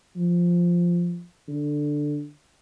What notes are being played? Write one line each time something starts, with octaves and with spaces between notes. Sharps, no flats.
F3
D3